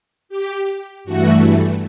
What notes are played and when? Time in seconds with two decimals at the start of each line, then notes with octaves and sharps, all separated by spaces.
0.29 G4
1.04 G2 E3 A3 F#4